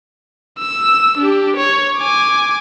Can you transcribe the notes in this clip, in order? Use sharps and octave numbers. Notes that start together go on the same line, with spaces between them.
E6
D4 G4
C#5
G#5 D6